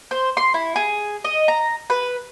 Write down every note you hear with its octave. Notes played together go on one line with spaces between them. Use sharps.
C5
C6
E4
G#4
D#5
A#5
B4